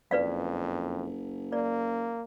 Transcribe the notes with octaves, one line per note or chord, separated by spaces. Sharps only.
F#1 F2 B4 D5 F5
A#3 D5